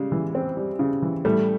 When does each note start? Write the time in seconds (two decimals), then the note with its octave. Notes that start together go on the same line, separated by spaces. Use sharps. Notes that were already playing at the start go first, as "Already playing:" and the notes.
Already playing: C#3 G3 G#3
0.12 E3
0.35 C4
0.57 G3
0.79 C#3
1.02 E3
1.25 A2 G3 A3